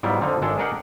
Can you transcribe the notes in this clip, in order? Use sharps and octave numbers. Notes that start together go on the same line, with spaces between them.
G#2 F#3 G3 B3 E4 F4
F2 D3 F3 D#4
G#1 G#3 D4 A4
D4 G#4 A#4 D#5 F#5 G5